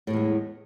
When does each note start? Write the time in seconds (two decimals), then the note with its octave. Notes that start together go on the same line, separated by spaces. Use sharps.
0.07 A2
0.10 A3
0.13 E2
0.16 G#3